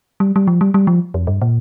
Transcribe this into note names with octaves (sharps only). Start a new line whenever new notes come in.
G3
G3
F3
G3
G3
F3
F2
G2
A#2